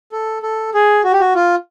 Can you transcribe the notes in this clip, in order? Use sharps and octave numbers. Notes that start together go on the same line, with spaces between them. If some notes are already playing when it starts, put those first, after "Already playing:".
A4
A4
G#4
F#4
G4
F#4
F4